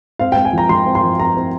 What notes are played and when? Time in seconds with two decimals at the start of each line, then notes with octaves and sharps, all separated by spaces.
0.19 C4 F5
0.32 C4 G5
0.45 G#5
0.53 F3 A#5
0.69 F3 C6
0.86 C4
0.95 C6
1.03 F3
1.20 C4 A#5
1.37 C4